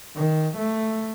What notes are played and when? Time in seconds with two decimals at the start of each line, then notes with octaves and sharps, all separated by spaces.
0.16 D#3
0.57 A3